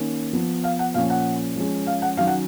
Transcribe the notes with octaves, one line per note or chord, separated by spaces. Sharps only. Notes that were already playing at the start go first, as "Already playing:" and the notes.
Already playing: D#3 A#3 C#4
F3 B3
F5
F#5
A#2 F3 A#3 C#4 F5
F#5
F3 G#3 C#4
F5
F#5
D#3 F#3 C#4 F5
F#5